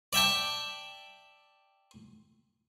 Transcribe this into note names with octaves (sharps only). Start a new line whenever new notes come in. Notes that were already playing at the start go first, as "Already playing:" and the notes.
D5 E5 G5 A5